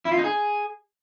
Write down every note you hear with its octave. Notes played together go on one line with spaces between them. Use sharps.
E4
F4
D#4
G#4